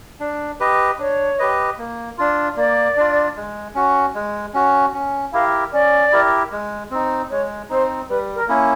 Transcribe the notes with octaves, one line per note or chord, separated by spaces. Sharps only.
D4
G4 B4 D#5
D4 C#5
G4 B4 D#5
A#3
D4 F4
A#3 D5
D4 F4
G#3
C#4 F#4
G#3
C#4 F#4
C#4
E4 G4 A#4 F5
C#4 D5
E4 G4 A#4
G#3
C4 D#4
G#3 C#5
C4 D#4 C5
G3 B4
A#4
A#3 C#4 E4